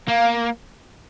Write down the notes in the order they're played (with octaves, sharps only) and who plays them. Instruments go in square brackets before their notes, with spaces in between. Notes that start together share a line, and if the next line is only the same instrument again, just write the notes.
[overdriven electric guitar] A#3 [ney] F5